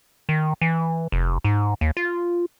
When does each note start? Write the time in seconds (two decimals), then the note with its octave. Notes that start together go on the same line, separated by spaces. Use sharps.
0.29 D#3
0.61 E3
1.12 F1
1.44 G#2
1.81 D#2
1.97 F4